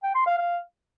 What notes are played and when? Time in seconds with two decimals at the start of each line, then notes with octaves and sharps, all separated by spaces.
0.03 G5
0.15 C6
0.27 F5
0.38 F5